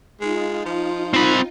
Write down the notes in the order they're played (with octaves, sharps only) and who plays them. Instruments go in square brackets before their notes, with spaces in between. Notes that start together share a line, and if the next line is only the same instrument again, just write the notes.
[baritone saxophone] G#3 [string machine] D#4 F4
[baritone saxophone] F3
[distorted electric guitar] C4 B5